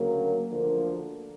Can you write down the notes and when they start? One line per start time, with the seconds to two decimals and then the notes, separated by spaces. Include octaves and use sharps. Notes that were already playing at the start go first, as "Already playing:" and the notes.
Already playing: D2 C#3 F#3 A#3
0.49 D2 D3 F3 A#3